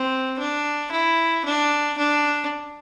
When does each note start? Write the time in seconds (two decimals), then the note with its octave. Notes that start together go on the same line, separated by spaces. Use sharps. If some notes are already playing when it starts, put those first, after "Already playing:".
Already playing: C4
0.39 D4
0.92 E4
1.45 D4
1.98 D4